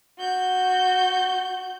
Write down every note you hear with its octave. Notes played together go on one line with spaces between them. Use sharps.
F#4 G6